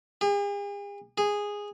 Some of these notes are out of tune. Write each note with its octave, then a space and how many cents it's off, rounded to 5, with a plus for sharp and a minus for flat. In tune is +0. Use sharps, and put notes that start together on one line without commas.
G#4 -45
G#4 -10